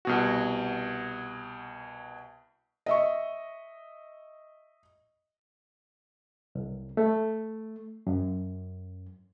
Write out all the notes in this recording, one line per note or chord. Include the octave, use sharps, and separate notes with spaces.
C2 B2 F#4
D#5 E5 C#6
C2
A3
F#2